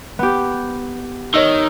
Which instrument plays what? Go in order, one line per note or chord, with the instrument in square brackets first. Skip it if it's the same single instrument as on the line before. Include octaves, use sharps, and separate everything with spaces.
[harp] B3 G4
[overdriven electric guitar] D#3 [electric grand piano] C#5 D#5 E6